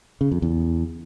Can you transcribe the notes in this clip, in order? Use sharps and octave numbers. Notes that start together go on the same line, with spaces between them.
C#3
F2
E2